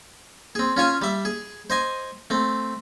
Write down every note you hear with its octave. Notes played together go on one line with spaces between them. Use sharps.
C4 G#4
C#4 F4 C#5 G#5
G3 E5
G#4
C5 D#5 G#5
A3 C4